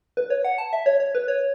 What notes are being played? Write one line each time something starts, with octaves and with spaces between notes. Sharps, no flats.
B4
C#5
F#5
A5
E5
C#5
C#5
B4
C#5